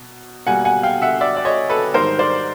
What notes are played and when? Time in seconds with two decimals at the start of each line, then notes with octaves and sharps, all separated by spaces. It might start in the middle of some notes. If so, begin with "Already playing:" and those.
Already playing: B2 F#3
0.46 B2 G3 A#3 F#5 G#5
0.65 F#5 G#5
0.83 F5 G5
1.02 E5 F#5
1.21 D5 E5
1.37 D5
1.45 C#5 D#5
1.70 A4 B4
1.94 G#2 D#3 G3 A#4 C5
2.19 C5 D5